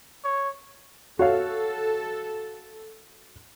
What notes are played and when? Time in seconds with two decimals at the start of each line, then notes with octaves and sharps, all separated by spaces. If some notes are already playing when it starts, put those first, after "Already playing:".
0.24 C#5
1.19 F#4 A4 C#5 F5